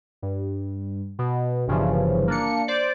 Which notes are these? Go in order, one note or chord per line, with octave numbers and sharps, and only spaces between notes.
G2
B2
G1 G2 C#3 E3 F3
A#3 D4 C#7
C5 D5